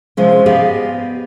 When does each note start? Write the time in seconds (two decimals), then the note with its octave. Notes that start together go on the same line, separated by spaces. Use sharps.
0.17 C3 F3 G#3 C#4
0.46 B3 G4 G#4 D5 D#5 F5